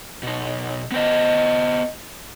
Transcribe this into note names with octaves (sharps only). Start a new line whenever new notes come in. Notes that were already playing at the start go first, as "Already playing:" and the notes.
B2 D#4
B3 C5 D#5